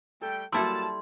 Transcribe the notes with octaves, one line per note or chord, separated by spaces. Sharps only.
G3 A3 A4 G5
F#3 G3 A#3 E4 A4 A5 C6 E6